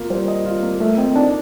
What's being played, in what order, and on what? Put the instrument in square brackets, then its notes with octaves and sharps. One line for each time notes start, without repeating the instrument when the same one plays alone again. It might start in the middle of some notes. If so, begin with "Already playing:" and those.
Already playing: [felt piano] A#3 F4
[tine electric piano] G3 [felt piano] C5
[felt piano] D#5
F4
A#3
[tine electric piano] A3 [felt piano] A4
[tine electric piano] C4 [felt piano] D#5
[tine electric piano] D4 [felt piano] D#4